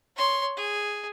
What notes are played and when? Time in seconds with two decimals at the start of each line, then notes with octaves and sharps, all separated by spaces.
0.16 C#5 C6
0.57 G#4